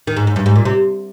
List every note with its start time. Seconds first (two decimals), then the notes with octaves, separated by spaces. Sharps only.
0.07 D#3
0.16 G#2
0.27 G#2
0.36 G2
0.46 G#2
0.56 A#2
0.65 C3